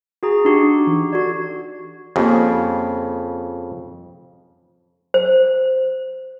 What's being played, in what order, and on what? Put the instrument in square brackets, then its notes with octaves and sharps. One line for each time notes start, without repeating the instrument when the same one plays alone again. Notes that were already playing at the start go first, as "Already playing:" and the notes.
[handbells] F#4 G#4 A#5
[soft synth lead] D4 [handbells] D#4 F#4 G4
[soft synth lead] E3
[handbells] F#4 A4 D5 [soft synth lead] G#6
[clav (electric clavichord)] F2 C#3 [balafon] A#3 G4
[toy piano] C5